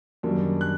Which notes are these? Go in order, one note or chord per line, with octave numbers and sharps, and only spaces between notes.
F#2 D#3 G3 A#3 D4
F#6